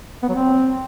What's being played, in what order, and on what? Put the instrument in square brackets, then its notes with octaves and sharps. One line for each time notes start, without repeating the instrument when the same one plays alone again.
[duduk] B3
F#3
C4